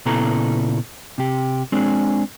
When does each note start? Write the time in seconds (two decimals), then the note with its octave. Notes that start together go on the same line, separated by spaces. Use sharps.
0.06 A#2 C#3 B3 E4 A4 A#5
1.18 C3 G4
1.72 G#3 C4 D4 G#4